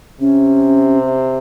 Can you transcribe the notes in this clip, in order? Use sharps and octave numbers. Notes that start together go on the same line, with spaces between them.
C3 C#4